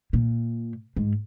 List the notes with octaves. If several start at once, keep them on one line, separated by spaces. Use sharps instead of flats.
A#2
G#2